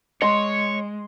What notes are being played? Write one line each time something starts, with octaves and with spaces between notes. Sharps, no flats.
G#3 C#5 D#5 C6